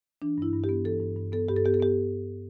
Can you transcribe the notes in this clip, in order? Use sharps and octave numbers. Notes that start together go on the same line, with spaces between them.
E3 D4
G2 E4
G2
G4
B3
E3 A4
G2
G2
B3 A4
G2 G4
A4
B3 G4
A4
B3 G4